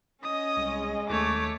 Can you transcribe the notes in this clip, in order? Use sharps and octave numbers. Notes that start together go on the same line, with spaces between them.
C#4 D#5 D#6
C2 G#3
D#2 A3 C#5 D6